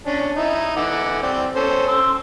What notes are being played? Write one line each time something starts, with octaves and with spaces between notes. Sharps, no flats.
C#4 D4
D#4 E4
E3 F#5 D6
C4 D5 G5
C#4 A4 C5
C6 E6